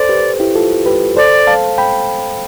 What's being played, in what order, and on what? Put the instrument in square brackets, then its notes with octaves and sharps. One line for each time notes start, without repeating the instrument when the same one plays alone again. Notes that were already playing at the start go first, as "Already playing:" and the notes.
Already playing: [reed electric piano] A4 C5 [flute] D5
[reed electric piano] G4 B4
E4 G4
F4 A4
G4 B4
[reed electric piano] A4 C5 [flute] D5
[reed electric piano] F5 A5
G5 B5